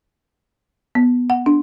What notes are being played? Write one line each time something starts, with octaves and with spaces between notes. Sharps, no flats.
B3
F#5
D4